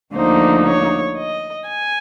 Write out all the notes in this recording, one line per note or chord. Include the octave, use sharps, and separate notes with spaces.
D2 D3 F3 A#3 D#4 C5
C#5
D#5
G#5